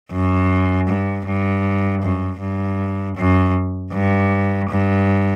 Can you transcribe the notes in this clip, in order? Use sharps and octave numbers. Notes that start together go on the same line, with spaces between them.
F#2
G2
G2
F#2
G2
F#2
G2
G2